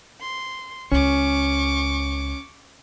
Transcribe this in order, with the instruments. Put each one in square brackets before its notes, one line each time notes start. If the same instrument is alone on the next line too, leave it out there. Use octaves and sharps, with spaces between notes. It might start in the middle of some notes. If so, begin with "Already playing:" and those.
[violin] C6
[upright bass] C#2 [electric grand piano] C#4 [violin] C#6 D6